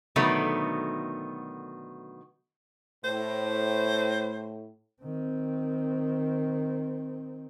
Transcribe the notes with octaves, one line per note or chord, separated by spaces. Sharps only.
B2 D3 D#3 F#3 A3 B3
A2 C5
D#3 C4